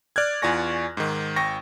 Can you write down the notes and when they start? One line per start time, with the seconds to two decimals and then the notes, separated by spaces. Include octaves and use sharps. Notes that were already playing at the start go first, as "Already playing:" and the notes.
0.16 D5 F6 F#6 G#6
0.42 E2 F4 D5 G#5 C#6 A#6
0.97 G#2 D#3
1.36 G#1 G5 C#6 A#6